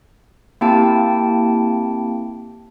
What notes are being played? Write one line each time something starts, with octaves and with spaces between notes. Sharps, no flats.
A#3 C4 E4 G4 G5 A5